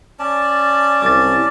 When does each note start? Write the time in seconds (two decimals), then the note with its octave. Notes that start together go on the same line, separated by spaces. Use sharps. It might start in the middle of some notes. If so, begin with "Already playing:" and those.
0.19 C#4 D5 A5
1.02 C2 D6 A6